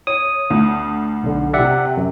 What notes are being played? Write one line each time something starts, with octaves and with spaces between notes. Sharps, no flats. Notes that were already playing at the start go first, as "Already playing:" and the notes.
C#5 D#6
D2
B1 D3
C3 G4 D5 E5 F#5
F#2